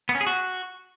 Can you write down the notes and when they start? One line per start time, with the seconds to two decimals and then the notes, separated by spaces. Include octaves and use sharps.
0.09 B3
0.15 C#4
0.21 G#4
0.27 F#4